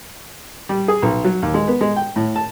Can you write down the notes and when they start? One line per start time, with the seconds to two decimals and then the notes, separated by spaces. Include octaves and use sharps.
0.69 G3
0.88 G#4
1.02 B1
1.24 F#3
1.42 D#2
1.54 G#3
1.68 B3
1.81 G#3
1.96 G5
2.16 A2
2.36 A5